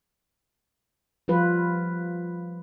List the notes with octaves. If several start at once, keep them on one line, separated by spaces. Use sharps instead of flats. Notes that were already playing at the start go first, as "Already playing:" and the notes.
F3 G3 F4 B4